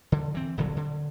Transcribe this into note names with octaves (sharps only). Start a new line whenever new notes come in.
D3
E3 C4
D#1 A#1 D3 F#3
D3